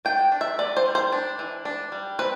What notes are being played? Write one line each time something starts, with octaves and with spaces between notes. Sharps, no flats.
D4 G5
D4
E5
B3 D5
C5
G3
C5
D4
E3
D4
G3
C4 B4